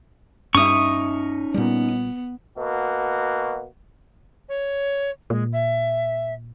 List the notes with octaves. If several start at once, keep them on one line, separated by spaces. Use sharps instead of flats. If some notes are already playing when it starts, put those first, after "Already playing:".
G2 C#4 D#4 E5 C#6 D#6
A#2 G3 B3
B2 A#3 F#4
C#5
A#2 G#3
E5